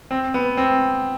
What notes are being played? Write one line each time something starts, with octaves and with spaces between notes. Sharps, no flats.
C4
B3
C4